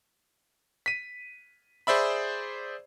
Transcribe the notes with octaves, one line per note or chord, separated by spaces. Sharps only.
B6 D#7
G#4 C5 D5 E5 B5